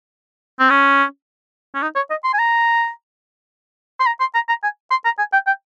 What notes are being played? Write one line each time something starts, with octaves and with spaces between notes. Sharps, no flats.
C4
C#4
C#4
D#4
C#5
D#5
C6
G#5
A#5
C6
A#5
C6
A#5
A#5
G#5
C6
A#5
G#5
G5
G5